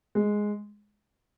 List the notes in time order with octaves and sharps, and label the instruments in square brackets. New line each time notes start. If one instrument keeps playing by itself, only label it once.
[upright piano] G#3